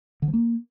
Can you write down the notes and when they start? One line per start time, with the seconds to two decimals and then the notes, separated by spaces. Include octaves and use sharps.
0.22 D3
0.28 F3
0.34 A#3